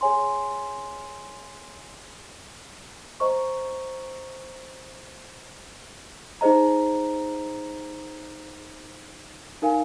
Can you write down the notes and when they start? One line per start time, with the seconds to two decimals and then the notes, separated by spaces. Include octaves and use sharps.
0.01 G#4 C#5 G#5 C6
3.20 C5 D#5 A#5 C#6
6.41 D#4 G#4 C5 D#5 A#5
9.62 D#4 A#4 F5 G#5